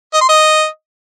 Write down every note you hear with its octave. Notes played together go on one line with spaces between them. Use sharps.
D#5
C6
D#5